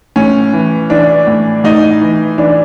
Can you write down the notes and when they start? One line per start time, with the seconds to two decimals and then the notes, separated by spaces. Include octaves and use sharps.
0.16 A2 C#4
0.53 E3
0.90 E3 D4
1.27 A2
1.64 A2 D#4
2.01 E3
2.38 E3 D4